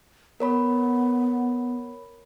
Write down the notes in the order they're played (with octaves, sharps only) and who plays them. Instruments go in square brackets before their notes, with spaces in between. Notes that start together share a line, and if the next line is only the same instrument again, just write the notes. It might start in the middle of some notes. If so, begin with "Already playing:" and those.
[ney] B3 [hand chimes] A#4 C#5 B5